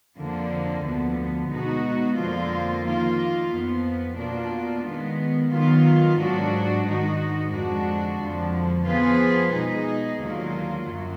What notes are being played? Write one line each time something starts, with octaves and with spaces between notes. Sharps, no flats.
F2 D3 F3 A#3
D2 D3 F3 B3
B2 G#3 B3 D#4 F#4
F2 D3 F3 A#3 F4
D#3 A#3 F4
F2 F3 B3
B2 A#3 D4 F4
D#3 G#3 B3
D#3 F#3 B3 F4
G#2 F#3 D4 F#4
G#2 D#3 G#3 D#4 F#4
F2 D3 G#3 D4 F#4
F2 D3 F3
F3 B3 F4 G#4 B4
B2 G#3 D#4 G#4
D#2 D3 F#3 A#3 F4
F#2 F#3